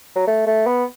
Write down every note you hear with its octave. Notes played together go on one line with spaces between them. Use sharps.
F#3
A3
A3
B3